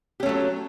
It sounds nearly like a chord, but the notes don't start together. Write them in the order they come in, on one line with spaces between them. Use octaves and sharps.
G4 C#4 A3 F#3